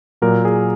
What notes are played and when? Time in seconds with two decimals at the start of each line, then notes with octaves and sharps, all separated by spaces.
0.22 A#2 F#3 A#4
0.45 G#4